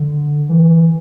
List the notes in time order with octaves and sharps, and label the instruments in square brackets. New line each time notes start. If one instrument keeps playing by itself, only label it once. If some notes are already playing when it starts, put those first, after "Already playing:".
Already playing: [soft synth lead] D3
E3